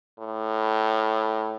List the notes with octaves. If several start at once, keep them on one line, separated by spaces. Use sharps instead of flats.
A2